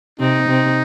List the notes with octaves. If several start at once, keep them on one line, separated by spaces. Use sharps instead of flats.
C3 C4 D#4
C3 C4